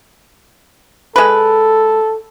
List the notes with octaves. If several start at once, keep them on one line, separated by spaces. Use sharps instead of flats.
G#3 A4 B4